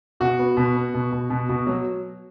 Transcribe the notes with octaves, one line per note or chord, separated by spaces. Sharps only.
B2 F#4
B3
B2
B3
B2
B2
B2
B2
F#3